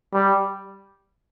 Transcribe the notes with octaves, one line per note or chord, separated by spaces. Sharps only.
G3